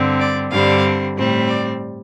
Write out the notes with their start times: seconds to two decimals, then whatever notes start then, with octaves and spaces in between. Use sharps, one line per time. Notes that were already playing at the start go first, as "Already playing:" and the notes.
Already playing: G2 D3 G3 C4
0.20 D5
0.52 G2 D3 G3 C4 F5
1.16 A2 G3 C4
1.48 D5